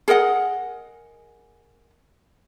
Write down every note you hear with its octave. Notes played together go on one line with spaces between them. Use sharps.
G#4 A#4 D#5 F#5